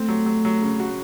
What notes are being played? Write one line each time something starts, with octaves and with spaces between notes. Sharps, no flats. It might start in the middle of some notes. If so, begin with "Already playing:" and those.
Already playing: A3 C4
F#3
F#3
F#3
C#3
F#4